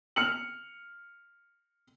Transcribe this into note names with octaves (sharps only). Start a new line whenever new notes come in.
F6 C#7 F#7